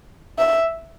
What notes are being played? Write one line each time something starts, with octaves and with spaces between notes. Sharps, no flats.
E5